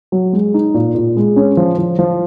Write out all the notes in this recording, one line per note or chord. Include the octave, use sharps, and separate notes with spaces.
F#3
G#3
D#4
A#2
A#2
G#3
C#4
F3
F3
F3